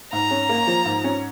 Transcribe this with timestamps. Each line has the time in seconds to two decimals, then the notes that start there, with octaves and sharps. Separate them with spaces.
0.13 G#2 A#5
0.31 C#4
0.49 A#3
0.67 F3
0.85 G#2
1.04 C#4